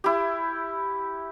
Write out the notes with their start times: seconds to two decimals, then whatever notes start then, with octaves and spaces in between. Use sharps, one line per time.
0.04 E4 G4